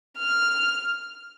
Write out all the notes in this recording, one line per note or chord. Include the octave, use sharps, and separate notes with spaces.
F6